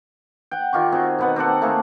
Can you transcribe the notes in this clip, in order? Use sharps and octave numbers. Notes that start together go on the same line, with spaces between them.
F#5 G5
D#3 F4 G4 C#6
C4 F#4 G#4
B2 B3 F#5
C4 G4 A4 F#5
A3 A#3 G#4 C5